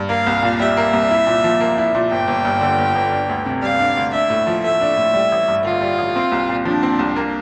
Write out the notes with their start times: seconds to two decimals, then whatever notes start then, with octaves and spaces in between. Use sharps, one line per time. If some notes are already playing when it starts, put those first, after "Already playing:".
Already playing: G2
0.09 A#3 F5
0.27 C2
0.43 A#2
0.60 G3 E5
0.77 A#3
0.93 C2
1.11 E4
1.27 A#2
1.44 F3
1.60 A#3
1.78 E4
1.95 A#2
2.11 G1 G5
2.28 G1
2.45 G2
2.61 D3
2.78 G1
2.95 G1
3.12 D4
3.29 D2
3.46 C3
3.62 G3 F5
3.79 D4
3.97 D2
4.13 D4 E5
4.30 A2
4.47 F3
4.64 A3 E5
4.81 D4
4.97 A2
5.14 G3
5.32 A1
5.48 G2
5.65 D3 F4
5.81 G3
5.98 A1
6.16 C4
6.32 C2
6.49 A#2
6.65 F3 D4
6.83 C4
6.99 C2
7.16 A#3